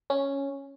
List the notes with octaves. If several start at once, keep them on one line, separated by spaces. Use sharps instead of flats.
C#4